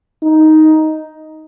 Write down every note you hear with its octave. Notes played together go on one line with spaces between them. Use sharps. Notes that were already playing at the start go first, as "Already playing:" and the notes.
D#4